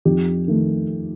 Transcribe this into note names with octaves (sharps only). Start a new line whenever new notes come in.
F2 D#4 G4
D#3 A3